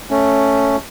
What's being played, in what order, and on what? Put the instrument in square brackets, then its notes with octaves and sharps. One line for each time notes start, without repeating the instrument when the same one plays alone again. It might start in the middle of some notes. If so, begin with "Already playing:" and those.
[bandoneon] A3 C#4